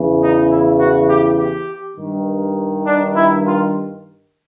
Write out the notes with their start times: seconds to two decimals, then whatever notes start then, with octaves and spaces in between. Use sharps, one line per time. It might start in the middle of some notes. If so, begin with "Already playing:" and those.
Already playing: E2 C#3 E3
0.21 D#4
0.50 E4
0.78 F#4
1.08 G4
1.38 G4
1.97 G2 D#3
2.85 D4
3.14 E4
3.44 F4